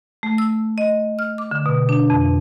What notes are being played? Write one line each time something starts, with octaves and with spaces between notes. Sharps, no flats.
A3
E6
D#5
F6
D6
D3
B2
D4
F2